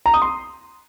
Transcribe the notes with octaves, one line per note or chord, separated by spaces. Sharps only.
A#5
D#6
C6